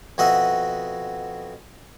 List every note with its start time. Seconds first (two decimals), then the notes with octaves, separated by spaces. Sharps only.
0.18 F2 B2 F#4 D#5 E5 F#5